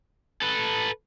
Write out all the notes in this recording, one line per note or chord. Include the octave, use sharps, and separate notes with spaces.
A4 B4